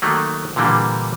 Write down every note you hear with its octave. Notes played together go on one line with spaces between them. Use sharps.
D#3 F#3 A3 A#3
A#2 D3 E3 G3 A#3